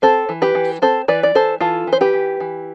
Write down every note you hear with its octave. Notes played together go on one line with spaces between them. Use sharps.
C4 A4 C5
E3
G4 B4
E3
C4 A4 C5
E3 B4 D5
D5
E3 A4 C5
E3 F4 A4
E3
C5
G4 B4
E3
E3